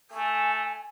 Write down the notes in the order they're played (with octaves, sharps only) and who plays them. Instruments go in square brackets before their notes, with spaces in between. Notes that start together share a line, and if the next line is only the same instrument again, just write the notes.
[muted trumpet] A3 [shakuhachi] G#5